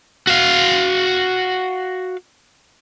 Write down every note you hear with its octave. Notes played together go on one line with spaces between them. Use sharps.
F#4 F5